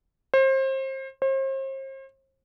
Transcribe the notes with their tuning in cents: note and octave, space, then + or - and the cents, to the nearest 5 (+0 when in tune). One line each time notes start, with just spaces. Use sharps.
C5 +30
C5 +40